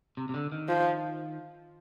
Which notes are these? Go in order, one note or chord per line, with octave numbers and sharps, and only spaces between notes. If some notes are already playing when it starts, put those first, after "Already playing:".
C3
C3
D3
D#3
F3